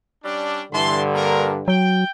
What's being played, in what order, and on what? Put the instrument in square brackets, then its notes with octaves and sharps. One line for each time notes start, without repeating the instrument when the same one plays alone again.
[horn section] G3 C#4 D4
[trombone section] G2 D3 [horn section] E3 A5 C6
[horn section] A#3 A#4
[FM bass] F#3 [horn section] G5